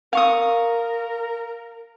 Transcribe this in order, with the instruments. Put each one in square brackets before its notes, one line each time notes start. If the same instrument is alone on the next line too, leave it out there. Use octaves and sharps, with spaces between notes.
[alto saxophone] A#4 [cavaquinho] F5 C#6 D#6